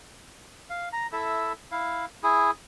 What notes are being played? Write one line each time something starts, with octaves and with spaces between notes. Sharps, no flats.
F5
A#5
E4 A4 E5
E4 F5
E4 G#4